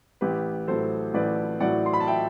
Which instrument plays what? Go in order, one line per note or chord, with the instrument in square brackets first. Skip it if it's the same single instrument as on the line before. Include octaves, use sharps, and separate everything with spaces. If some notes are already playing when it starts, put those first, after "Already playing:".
[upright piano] A1 G4 B4
A2 F#3 A4 C5
A1 B4 D5
A2 F#3 D5 F#5
C6
B5
A5
E5 G5